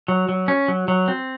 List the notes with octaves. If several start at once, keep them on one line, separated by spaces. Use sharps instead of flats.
F#3
F#3
C#4
F#3
F#3
C4